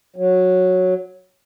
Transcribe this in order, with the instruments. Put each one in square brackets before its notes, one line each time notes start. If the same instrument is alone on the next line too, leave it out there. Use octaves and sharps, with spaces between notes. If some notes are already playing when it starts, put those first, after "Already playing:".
[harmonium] F#3